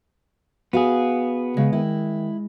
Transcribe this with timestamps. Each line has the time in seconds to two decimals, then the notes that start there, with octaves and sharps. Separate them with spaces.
0.73 B3 F#4 G#4 F5
1.57 C#3 G#3
1.73 D#3 E4